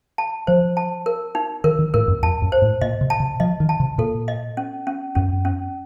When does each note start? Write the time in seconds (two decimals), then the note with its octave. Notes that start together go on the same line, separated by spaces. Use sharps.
0.18 A5
0.47 F3 C5
0.77 A5
1.06 A#4
1.35 D#4
1.64 D#3 A#4
1.79 D#3
1.94 A2 A#4
2.08 F#2
2.22 F2 A5
2.42 F#2
2.52 C5
2.62 A2
2.81 A#2 D#5
3.01 C3
3.10 A5
3.20 C3
3.40 F3 D#5
3.60 D#3
3.69 A5
3.80 C3
3.98 A#2 A4
4.28 D#5
4.57 C#4
4.87 C#4
5.15 F#2 C#4
5.45 C#4